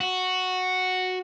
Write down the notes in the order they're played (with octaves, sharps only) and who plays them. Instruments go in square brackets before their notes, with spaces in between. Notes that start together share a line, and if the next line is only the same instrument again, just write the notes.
[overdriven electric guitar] F#4